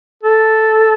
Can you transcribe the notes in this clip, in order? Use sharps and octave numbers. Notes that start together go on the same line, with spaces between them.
A4